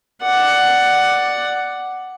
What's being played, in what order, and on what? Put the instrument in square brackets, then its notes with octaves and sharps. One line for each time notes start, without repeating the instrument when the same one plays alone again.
[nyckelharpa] D5 F#5